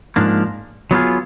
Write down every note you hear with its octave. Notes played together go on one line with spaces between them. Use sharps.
G#2 F3 A#3 D4
F#3 B3 D4 F4 G#4